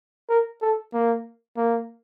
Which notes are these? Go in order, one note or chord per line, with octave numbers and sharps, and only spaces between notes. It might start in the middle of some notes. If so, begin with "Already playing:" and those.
A#4
A4
A#3
A#3